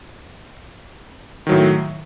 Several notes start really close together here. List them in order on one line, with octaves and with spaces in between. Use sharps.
D#3 F#3 A2